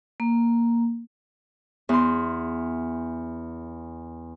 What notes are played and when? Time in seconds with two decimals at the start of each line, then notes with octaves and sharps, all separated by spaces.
0.20 A#3
1.89 E2 C6